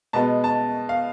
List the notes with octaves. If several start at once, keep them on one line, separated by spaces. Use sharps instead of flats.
B2 G#3 B3 A5
A5
F5